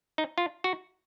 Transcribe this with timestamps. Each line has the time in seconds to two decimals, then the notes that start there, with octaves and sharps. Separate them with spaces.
0.18 D#4
0.38 F4
0.64 F#4